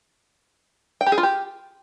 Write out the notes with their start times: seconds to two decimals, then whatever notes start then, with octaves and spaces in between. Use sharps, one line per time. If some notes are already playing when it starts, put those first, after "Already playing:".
1.01 G5
1.06 G4
1.12 G#4
1.18 F4
1.23 G4